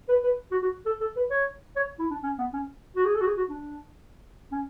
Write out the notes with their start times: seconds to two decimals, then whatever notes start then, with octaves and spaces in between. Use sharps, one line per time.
0.09 B4
0.24 B4
0.52 F#4
0.63 F#4
0.86 A4
1.01 A4
1.16 B4
1.31 C#5
1.76 C#5
1.99 E4
2.11 D4
2.23 C#4
2.39 B3
2.53 C#4
2.96 F#4
3.05 G#4
3.15 A4
3.21 F#4
3.26 G#4
3.37 F#4
3.49 D4
4.52 C#4